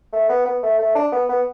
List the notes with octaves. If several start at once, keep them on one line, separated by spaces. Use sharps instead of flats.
A3
B3
B3
A3
A3
D4
B3
B3